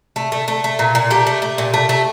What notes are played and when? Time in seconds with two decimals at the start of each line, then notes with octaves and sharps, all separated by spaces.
0.16 A3
0.32 A3
0.48 A3
0.64 A3
0.79 A#2
0.95 A#2
1.10 A3 G4
1.27 A3
1.42 A3
1.58 A#2
1.74 A3
1.89 A3